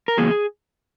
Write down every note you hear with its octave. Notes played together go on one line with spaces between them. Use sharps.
A#4
E2 C#3 F#3 A#3 G#4